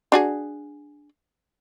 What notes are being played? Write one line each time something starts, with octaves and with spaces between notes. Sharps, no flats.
D4 F#4 G#4